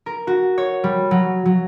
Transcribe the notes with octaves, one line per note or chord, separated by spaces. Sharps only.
A#4
F#4
C#5
G3
F#3
F#3